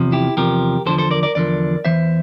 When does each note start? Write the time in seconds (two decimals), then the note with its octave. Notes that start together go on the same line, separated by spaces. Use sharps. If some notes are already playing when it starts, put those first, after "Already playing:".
Already playing: E2 C3 F3
0.12 E4 G4
0.37 E2 C3 F3 G4 A#4
0.86 E2 D3 F3 A4 C5
0.98 A4 C5
1.11 A#4 D5
1.23 A#4 D5
1.35 E2 D3 F3 A#4 D5
1.85 E2 E3 C5 E5